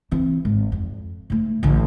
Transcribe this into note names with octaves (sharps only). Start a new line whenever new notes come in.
E3 C4
G#1
F2
G#2 A3
A1 D3